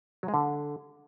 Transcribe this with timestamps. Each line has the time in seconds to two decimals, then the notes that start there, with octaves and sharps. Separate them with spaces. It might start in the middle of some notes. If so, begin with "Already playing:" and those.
0.23 F#3
0.28 G#3
0.34 D3